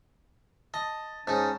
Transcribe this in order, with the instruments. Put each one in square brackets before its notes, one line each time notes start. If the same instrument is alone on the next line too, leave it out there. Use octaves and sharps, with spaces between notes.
[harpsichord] D#5 [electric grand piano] A5
[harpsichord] G#2 D#4 [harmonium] C#4 [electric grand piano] A5